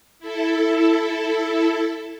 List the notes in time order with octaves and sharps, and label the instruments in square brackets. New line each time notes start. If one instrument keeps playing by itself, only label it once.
[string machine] E4 A4